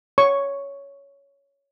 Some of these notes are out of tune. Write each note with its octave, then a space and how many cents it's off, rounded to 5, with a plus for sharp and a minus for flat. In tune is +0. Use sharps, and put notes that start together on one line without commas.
C#5 +10 C#6 +0